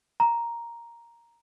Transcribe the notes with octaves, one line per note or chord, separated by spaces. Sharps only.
A#5